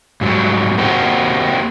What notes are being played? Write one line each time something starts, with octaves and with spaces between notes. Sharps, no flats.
G#2 F#3 G3
A#3 C4 F#4 G4